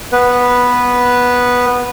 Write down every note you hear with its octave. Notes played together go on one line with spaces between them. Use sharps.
B3 B4